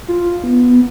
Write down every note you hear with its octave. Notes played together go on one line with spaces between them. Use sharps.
F4
B3